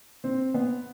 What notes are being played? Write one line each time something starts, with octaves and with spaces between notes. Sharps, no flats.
C4
B3